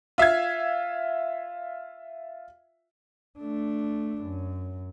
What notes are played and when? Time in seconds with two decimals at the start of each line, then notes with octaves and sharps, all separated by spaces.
0.18 F4 E5 F5 G#6
3.39 A3 D4
4.24 F#2